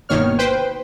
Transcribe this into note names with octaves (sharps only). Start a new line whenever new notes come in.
G1 B2 D#3 A#3 C#5 F6
B4 C5 G5